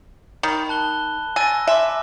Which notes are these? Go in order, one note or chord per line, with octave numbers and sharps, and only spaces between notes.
D#3 B5 D#6
A5 F#6 G7
G#5 E6 A6 A#6
E5 G#5 C6 D6